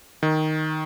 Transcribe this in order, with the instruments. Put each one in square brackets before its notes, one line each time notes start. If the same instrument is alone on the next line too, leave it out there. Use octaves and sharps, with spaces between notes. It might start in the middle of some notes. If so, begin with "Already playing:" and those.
[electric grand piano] D#3